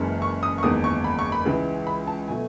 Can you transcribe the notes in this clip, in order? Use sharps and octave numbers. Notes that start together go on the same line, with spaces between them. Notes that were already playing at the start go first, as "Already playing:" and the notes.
Already playing: F#1 F#2 E3 G#3
C#6
D#6
C#6
F#1 E2 D#3 G#3 D#6
C#6
B5
C#6
B5
C#2 C#3 E3 G#3
B5
A5
B2 F#3 A3 G#5